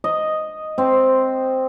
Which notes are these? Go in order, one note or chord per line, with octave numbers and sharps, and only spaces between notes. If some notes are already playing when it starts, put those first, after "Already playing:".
D#5
C4 C5